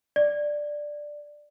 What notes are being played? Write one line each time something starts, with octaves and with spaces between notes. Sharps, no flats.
D5